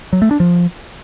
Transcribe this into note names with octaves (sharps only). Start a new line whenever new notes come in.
F#3
A3
D4
F3